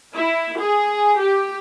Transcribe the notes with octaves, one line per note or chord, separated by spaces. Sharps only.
E4
G#4
G4